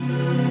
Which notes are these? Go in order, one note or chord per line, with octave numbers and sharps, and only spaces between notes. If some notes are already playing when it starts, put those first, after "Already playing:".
Already playing: C#3 F3 B3 B4